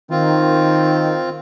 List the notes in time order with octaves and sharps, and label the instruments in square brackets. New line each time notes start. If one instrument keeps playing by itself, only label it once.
[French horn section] D#3 [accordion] C4 F4